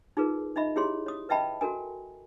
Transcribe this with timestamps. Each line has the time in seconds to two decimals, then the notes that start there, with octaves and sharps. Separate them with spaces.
0.17 D#4 F4 G#4 A#4 B4
0.56 D#4 D#5 E5 B5
0.76 E4 G4 G#4 C#5 C6
1.06 C#5 D#6
1.29 B4 D#5 E5 G5 A5 B5
1.61 F#4 A4 A#4 G#5